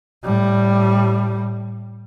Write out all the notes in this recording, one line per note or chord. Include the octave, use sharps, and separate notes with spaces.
A2 G3